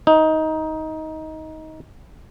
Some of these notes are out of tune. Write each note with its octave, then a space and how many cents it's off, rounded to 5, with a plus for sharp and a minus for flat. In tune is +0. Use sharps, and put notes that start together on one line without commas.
D#4 +15